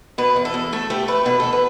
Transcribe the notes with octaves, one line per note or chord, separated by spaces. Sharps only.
B2 B4
E2
A4
E2
A3 A4
A3 G4
A3 B4
B2 B4
E2 A4
B4